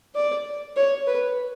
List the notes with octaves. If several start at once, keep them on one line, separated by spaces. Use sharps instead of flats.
D5
C#5
B4